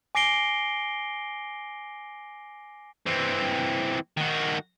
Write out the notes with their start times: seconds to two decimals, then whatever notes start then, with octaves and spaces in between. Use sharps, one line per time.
0.15 G#5 D6 A#6 C7 D7 G7
3.06 E3 C4
4.17 D#3 F#4